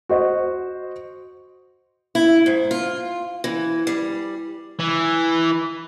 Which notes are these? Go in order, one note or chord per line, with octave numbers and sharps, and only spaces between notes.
F#4 C5 D#5
E4
G#2
F4
E3
G3
E3